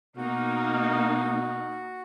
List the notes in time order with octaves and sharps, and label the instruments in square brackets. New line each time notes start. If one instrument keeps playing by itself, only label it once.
[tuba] B2 [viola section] A#3 D#4 [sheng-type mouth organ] F#4